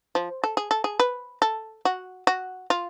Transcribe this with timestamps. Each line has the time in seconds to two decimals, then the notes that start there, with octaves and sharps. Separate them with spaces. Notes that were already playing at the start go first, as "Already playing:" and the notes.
0.15 F3
0.44 A4
0.57 G#4
0.71 A4
0.84 G#4
0.99 B4
1.42 A4
1.85 F#4
2.27 F#4
2.70 F4